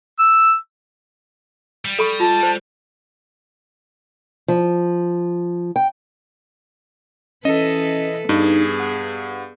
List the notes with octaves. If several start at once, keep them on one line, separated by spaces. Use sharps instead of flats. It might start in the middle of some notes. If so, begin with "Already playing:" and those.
E6
G3
A4 B5 C#6
F4 A5
C5
F3
G5
E3 C#4 A4 B4 D#5
G2 B3 D#4 G#4
F#5